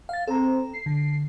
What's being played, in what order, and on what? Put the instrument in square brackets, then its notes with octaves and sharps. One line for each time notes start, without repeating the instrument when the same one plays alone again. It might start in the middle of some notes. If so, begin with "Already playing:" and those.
[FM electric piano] F5 A6
[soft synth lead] C4 [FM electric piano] A4 A#5
[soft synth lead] C7
[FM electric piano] D3